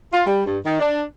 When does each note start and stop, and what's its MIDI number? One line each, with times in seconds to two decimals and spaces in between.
0.13 0.22 65
0.27 0.46 55
0.46 0.58 43
0.65 0.79 51
0.80 1.01 62